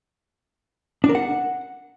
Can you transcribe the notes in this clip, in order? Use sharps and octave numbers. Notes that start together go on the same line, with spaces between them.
D4
A#4
F#5